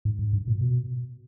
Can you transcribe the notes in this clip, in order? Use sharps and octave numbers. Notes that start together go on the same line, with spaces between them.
G#2
G#2
G2
A#2
B2